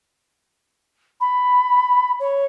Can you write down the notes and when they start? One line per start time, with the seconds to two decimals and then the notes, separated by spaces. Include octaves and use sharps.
1.20 B5
2.19 C#5